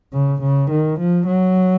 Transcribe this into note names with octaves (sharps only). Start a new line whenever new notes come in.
C#3
C#3
D#3
F3
F#3